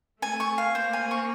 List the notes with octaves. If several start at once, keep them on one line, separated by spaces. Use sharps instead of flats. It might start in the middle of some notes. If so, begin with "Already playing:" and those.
A3 G#5
C#6
F5
A#3 C5
G#5
C#6